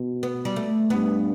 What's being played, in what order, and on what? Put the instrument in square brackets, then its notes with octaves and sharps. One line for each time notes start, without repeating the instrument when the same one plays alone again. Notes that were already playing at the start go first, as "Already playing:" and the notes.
Already playing: [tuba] B2
[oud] B3
G3
A3
[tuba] G2 [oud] B3